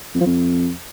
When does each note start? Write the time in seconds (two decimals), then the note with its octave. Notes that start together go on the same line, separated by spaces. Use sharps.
0.15 F2
0.21 F3
0.26 F2